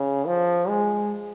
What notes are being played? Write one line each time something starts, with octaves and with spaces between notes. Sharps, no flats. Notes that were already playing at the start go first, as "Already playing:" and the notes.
Already playing: C#3
F3
G#3